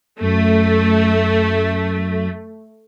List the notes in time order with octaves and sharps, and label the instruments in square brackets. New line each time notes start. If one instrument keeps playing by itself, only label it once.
[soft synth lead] F#2 [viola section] A3